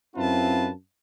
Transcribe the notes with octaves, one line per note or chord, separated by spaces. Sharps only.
F#2 C4 E4 F4 B4 A5